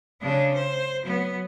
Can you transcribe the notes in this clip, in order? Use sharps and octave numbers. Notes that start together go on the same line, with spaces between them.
C#3 D4
C5
F#3 B3